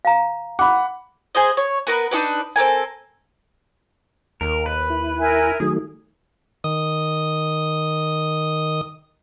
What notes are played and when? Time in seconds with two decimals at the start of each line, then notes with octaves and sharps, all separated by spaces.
0.05 F5 A#5
0.59 F#5 B5 D6
1.35 G#4 C5 D#5
1.57 C#5
1.87 B3 A#4 B4
2.11 D4 D#4 G4 B4
2.56 C4 A4 A#4 G#5
4.41 D#2 A#4
4.66 B4
4.90 E4
5.18 A#4 E5 G#5
5.60 D#3 F#3 A3 G#4
6.64 D#3 D#6